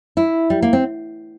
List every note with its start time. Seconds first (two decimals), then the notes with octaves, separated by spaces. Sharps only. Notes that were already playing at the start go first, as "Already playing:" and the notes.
0.17 E4
0.50 G3
0.62 A#3
0.73 C4